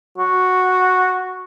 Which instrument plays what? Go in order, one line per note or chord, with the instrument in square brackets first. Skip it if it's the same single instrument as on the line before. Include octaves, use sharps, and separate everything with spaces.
[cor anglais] F#4